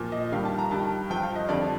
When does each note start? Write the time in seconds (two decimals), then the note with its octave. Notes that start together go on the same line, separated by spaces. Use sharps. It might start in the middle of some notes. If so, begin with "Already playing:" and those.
Already playing: A#2 F3
0.12 D#5
0.32 G2 D#3 G3 F5
0.45 A5
0.58 A#5
0.71 G2 D#3 G3 A5
1.10 G2 F3 G5
1.23 F5
1.36 D#5
1.49 F2 D3 G3 D5